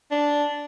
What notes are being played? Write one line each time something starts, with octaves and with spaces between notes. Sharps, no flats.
D4